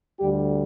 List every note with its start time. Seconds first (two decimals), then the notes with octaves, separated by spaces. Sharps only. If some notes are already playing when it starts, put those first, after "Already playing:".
0.20 D2 D3 G3 G4